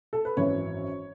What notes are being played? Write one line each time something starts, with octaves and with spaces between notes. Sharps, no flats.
A4
B4
G#1 F#2 E3 C#5